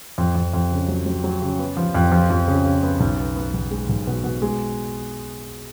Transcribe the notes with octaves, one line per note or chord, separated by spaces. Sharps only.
F2
F2
F2
C#3
F#3
F#3
F#3
C#3
B3
F3
F2
F3
F2
C#3
C#3
B3
B1
B3
B3
B1
G#3
B1
B2
B2
G#3